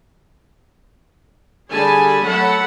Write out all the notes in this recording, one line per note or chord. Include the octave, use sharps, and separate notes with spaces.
D3 G3 G#4 G#5 A5 B5
F#3 A3 A4 F#5 A5 B5